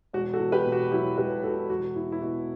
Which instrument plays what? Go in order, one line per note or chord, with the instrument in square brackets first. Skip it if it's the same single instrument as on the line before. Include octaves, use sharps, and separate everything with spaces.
[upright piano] E1 F#4
F#4 A4
E2
G4 B4
B2
F#4
F#3 E4 G4
E1 G4 B4
E2 F#4 A4
E1 F#4
E2 E4
E4
B2 F#4